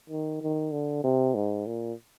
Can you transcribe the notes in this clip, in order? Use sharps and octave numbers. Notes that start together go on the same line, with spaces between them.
D#3
D#3
D3
C3
G#2
A#2